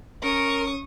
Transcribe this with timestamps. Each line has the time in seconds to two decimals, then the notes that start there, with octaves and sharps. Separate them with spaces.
0.23 C#4 A#4 C#6 D#6